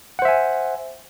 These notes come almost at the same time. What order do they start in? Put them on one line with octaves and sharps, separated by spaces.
F#5 C5 E5 G#5